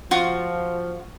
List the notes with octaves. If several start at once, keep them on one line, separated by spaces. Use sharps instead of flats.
F3 F4 F#4